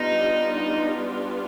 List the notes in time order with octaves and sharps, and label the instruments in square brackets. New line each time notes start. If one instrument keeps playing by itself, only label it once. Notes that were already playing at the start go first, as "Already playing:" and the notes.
Already playing: [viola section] G3 B3 D4 F4 [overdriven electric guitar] D#4